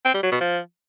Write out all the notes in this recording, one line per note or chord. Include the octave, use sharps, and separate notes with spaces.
C4
G3
F#3
B2
F3